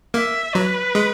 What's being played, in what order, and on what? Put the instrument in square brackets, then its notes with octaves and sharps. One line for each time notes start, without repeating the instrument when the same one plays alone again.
[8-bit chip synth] A#3 [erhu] E5
[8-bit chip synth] F#3 [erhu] B4
[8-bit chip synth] G#3